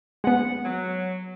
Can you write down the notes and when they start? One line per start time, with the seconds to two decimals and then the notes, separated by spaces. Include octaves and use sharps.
0.24 G#3 B3 F#5
0.64 F#3